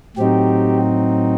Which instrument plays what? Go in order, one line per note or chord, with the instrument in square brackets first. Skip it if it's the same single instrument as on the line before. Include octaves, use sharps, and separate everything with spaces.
[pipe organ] A2 F#3 C4 D#4 G4